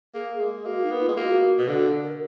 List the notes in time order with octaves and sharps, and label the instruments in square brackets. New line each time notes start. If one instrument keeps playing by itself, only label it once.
[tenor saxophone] A#3 [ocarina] G#4
[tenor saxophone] G#3
[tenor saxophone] A#3 [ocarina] F#4
[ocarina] D#4
[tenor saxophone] B3
[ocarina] F4
[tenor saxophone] G#3
[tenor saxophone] A#3 [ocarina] F#4 G#4
[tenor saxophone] B2
[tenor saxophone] D3 [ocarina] F#4
[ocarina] A#4